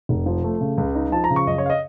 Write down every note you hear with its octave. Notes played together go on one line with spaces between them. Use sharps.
F1
F3
A3
C#3
C#2
D#4
F3 A5
A#5
C#3
C#6
F#2 D#5
C#5
F5
D#5